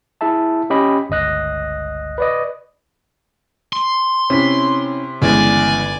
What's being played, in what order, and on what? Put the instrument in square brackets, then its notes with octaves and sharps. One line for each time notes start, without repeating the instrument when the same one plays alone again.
[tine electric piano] E4 G#4 E5 A5
C#4 G4 D#5 B5
G1 C#2 D#5 F#6 A#6
B4 D5 D#5
[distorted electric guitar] C6
[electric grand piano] C3 [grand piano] C#4 E4 B6
[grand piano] G1 [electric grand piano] C#3 E3 G#3 [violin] D5 G#5